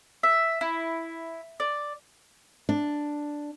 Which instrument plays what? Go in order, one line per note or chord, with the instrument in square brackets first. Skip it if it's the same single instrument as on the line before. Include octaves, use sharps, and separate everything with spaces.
[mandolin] E5
E4
D5
[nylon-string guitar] D4